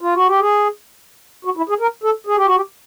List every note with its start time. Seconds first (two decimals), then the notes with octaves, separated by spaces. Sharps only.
0.01 F4
0.14 F#4
0.27 G4
0.40 G#4
1.45 F#4
1.57 E4
1.69 G#4
1.80 A#4
2.03 A4
2.27 G#4
2.36 G4
2.46 F#4
2.56 G4